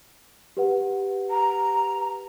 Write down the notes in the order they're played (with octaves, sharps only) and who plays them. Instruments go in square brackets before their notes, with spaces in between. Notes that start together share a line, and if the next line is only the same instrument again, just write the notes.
[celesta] G4 B4 F#5
[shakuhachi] A#5